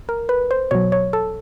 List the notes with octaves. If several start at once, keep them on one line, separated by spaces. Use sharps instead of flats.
A#4
B4
C5
B2 F#3 C#5
C#5
A4